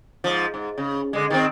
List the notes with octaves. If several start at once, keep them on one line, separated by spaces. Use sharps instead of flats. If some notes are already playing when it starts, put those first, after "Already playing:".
G#2 F3
G#2
C#3
D3 G#3
D#3 A#3 C4